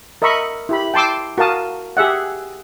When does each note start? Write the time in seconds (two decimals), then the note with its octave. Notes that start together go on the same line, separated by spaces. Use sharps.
0.22 A#4 D#5 E5 B5 C#6
0.69 E4 G4 B5
0.94 G5 A5 C6 D6 E6
1.38 F#4 A#4 F5 A5 D#6
1.97 G4 G#4 E5 F#5